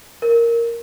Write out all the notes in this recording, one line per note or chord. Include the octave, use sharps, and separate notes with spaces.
A#4